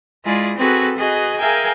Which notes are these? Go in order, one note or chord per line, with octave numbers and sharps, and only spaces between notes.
G#3 E4 F4 G#4 D5
C4 F#4 G#4 A4 B4
F#4 G#4 B4 D#5
G#4 A#4 E5 F5 G5 G#5